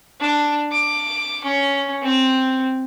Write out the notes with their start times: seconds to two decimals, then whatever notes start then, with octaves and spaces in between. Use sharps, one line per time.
0.20 D4
0.71 D6
1.44 C#4
2.02 C4